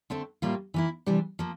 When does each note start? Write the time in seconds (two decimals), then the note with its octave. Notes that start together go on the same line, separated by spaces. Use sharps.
0.10 D3 A3 C4
0.42 A2 G3 A#3 F4
0.74 E3 A#3 E4
1.06 C3 E3 G3 D4
1.39 F3 A#3